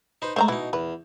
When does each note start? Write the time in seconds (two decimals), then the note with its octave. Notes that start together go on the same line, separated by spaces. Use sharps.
0.22 D#4 B4 C5
0.36 G#3 A3 C5 E5 A#5
0.48 B2 E3 D#4 E4
0.73 E2 B4